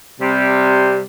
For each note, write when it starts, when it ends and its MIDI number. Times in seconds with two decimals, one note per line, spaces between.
0.21 1.00 48
0.21 1.00 55